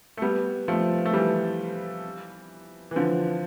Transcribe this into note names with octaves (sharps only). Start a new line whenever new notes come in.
A3
G3 B3
F3 A3
A3
E3 G3
E3
D3 F3